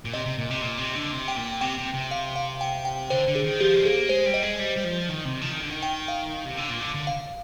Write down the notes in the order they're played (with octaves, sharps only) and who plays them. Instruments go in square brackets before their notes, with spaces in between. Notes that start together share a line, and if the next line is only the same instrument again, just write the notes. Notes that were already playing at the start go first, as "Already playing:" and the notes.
[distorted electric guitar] A#2
[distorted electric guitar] C3 [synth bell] D#5
[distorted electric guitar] C3
A#2
C3
A#2
C3
D3
C3
[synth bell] G5
[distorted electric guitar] A#2
[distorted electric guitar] C3 [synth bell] G5
[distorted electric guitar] C3
C3
[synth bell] F5
F5
G5
G5
[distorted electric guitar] D3 [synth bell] C5
[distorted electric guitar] D3
[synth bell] G#4
[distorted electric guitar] D#3
[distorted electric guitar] F3 [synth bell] G4
[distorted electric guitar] G#3
[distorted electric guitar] A#3 [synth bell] G#4
[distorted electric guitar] G#3 [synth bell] C5
[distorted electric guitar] G3
[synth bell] D#5
[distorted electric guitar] G#3
G3
G3
F3
D#3
C3
F3
D#3
D3
D#3
[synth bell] G5
F5
[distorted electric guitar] C3
D3
A#2
D3
D3
[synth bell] F5